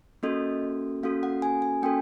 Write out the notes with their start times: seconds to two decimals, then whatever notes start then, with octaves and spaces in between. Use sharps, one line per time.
0.23 A#3 C#4 F#4 A4 D#5
1.03 A#3 C#4 F#4 A4 F5
1.23 F#5
1.42 G#5
1.62 G#5
1.82 A#3 C#4 F#4 A4 G5